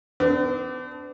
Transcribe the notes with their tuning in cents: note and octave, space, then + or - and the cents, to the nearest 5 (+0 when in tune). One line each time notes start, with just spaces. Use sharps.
B3 +45 D4 -5